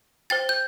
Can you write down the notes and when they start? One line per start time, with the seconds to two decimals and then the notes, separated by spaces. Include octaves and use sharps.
0.30 C5 G5 A6
0.49 G6